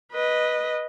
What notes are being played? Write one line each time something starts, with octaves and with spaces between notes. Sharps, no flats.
B4 D#5